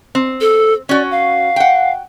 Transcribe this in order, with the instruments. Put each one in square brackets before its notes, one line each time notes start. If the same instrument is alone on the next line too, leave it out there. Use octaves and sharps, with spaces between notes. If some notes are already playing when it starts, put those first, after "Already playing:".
[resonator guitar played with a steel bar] C4
[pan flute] A4
[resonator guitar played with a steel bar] C#4 F#4 [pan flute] D5
[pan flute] F5
[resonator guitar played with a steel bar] F#5 G5